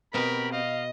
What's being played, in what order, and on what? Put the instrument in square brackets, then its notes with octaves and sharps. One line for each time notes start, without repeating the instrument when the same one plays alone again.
[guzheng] B2 B3 B4 [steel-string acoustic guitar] C4 G4 [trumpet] A#4 [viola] B5
[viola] D#5 [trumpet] F5